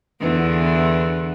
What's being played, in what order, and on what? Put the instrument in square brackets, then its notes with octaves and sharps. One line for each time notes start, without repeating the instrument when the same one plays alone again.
[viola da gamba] E2 D3 E3